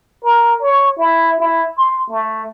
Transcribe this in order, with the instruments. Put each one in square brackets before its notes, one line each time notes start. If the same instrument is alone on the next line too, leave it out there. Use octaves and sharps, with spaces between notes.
[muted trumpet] A#4
C#5
E4
E4
C6
A3